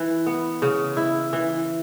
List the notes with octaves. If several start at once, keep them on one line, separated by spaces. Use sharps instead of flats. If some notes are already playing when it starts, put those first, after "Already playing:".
Already playing: E3
B3
C#3
E4
E3